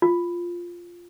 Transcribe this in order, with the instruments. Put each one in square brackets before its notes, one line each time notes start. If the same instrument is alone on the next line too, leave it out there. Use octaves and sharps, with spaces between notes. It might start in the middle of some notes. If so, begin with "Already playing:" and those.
[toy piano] F4